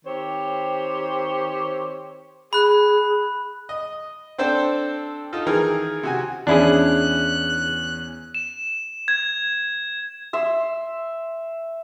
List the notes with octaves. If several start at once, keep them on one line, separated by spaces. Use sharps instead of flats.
D#3 C4 G4 C5 C#5
G#4 B5 F#6
D#5
C4 D4 A4 C5 G5
D#4 F4 A4
D#3 E3 G#4 A#4 F6
C3 F#4 G#5
E2 C#4 D4 E4 G#4 F#6
E7
G#6
E5 C6 E6